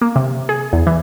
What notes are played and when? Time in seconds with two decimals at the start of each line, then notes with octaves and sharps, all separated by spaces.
0.01 A#3
0.16 C3
0.49 G#4
0.73 E2
0.87 E3